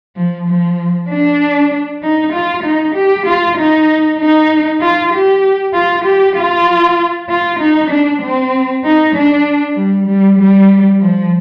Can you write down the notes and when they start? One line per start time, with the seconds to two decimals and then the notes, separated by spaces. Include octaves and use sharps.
0.16 F3
0.47 F3
1.09 D4
2.02 D#4
2.33 F4
2.64 D#4
2.95 G4
3.26 F4
3.57 D#4
4.19 D#4
4.81 F4
5.13 G4
5.74 F4
6.04 G4
6.36 F4
7.29 F4
7.59 D#4
7.90 D4
8.22 C4
8.84 D#4
9.15 D4
9.76 G3
10.07 G3
10.39 G3
11.00 F3